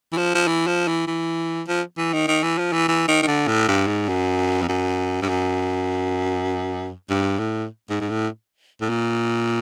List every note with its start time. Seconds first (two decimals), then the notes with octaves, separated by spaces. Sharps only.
0.12 E3
0.17 F3
0.35 F3
0.47 E3
0.67 F3
0.88 E3
1.07 E3
1.68 F3
1.97 E3
2.13 D#3
2.28 D#3
2.43 E3
2.58 F3
2.72 E3
2.88 E3
3.08 D#3
3.22 D#3
3.27 D3
3.47 A2
3.68 G2
3.87 G#2
4.08 F#2
4.62 F2
4.68 F#2
5.22 G2
5.29 F#2
7.10 G2
7.39 A2
7.90 G#2
8.01 G#2
8.10 A2
8.81 A2
8.89 A#2